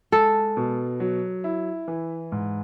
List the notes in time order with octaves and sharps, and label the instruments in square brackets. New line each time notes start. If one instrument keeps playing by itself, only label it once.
[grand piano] G#3 [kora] A4
[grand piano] B2
F#3
E4
E3
G#2